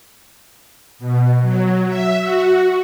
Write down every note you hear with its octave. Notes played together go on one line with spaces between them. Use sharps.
B2
F#3
E5
F#4